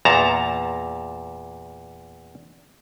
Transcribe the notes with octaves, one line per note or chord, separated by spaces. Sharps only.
E2 A#2 A5 A#5